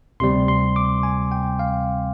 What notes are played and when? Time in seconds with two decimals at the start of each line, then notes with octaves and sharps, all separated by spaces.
0.20 D2 C3 G3 C4 C6
0.48 C6
0.76 D6
1.03 G#5
1.32 G5
1.59 F5